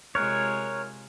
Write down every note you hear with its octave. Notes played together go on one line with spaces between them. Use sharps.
C3 G#3 F4 A#4 C#5 C#6 F6 F#6